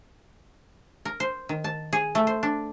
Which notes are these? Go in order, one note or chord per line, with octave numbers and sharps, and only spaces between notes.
A#4
C5
D#3
A5
G#4
A3
C5
D4